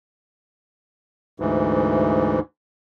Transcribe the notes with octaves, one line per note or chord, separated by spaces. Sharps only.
D2 G#2 E3